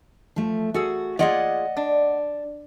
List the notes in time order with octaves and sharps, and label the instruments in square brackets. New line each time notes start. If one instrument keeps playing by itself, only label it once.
[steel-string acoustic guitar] F3 A3
[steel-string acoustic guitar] F#4 [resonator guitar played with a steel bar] G#4 A4 G#5
[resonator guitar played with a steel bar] A#3 F4 G#4 [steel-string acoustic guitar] D5 D#5 F#5
[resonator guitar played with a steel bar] D4